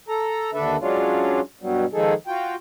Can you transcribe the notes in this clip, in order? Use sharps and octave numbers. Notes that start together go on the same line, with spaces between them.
A4 A#5
D#2 D3 D4 A4 B4 E5
F#3 G#3 C#4 D4 F4
G2 B2 F#3 G3
D#3 F3 G#3 D#4 G#4 A4
F4 F#4 G5